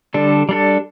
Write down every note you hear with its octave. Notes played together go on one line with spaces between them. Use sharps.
D3 G3 D4 A4
G3 D4 A4